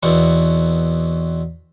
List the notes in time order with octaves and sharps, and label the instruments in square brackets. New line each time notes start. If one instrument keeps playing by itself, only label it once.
[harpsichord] E2 B2 C4 C#6